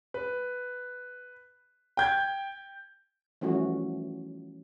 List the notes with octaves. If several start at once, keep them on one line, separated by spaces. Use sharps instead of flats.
B4
G5 G6 G#6
E3 F3 G3 A3 C#4 F#4